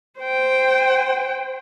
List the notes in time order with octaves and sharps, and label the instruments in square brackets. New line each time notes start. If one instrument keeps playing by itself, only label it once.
[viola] C5 G5